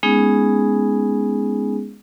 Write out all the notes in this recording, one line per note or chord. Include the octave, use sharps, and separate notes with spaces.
G#3 B3 C#4 D#4 G#4